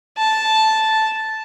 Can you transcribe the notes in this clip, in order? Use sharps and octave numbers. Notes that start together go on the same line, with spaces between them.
A5